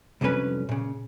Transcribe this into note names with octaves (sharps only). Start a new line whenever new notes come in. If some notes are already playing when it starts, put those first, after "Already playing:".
C2 F2 D3 F#3 C#4 B4
A#2 C#3